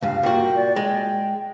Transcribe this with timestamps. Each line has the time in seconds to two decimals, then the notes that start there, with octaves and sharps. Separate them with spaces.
0.02 C#2 G2 F5
0.23 A#2 F#4 G5
0.56 D5
0.76 G#3 G5